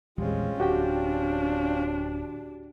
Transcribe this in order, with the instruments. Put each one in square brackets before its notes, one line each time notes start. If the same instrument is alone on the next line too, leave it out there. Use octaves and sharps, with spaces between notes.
[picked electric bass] A#1 E2 G3 [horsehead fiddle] G#3 [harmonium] C4 C#4 F4
[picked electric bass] D1 [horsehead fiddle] D4 [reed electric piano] F#4 G4 G5